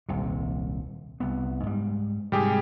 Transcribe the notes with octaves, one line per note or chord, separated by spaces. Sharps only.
D#1 C2 C3
C2 B3
G#2 G3
G#2 C3 G3 G4 G#4